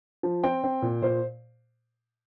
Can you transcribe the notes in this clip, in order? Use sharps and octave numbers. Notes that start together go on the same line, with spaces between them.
F3
C4 G5
C4
A#2
A#2 C5